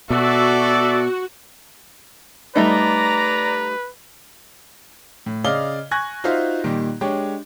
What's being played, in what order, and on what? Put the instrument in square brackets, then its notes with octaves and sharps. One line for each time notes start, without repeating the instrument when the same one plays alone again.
[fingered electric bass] B2 [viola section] F#4 [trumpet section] A4 D5 E5
[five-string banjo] G3 A3 D#4 [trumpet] B4 [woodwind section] D5 A#5
[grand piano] A2
C#3 D5 D#5 F5 F6 G7
G#5 C#6 F#6 G#6 A#6
D#4 F4 F#4 C5 E5 F5
A#2 D#3 G3
G#3 D4 G4 C#5